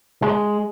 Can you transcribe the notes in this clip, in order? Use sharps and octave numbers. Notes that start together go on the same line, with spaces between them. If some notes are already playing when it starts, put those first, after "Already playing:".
G#3